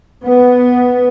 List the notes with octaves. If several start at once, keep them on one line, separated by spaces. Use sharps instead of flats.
B3